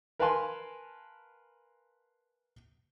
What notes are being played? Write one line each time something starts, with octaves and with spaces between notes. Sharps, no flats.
A#4 B4 F5 G#5 A5 C6